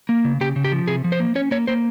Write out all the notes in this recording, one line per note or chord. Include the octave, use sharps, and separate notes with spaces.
A#3
C#3
C#3 G4
C#3
G4
F3
C3 G#4
F3
C5
A#3
C#4 C#5
A#3 C#5
A#3 C5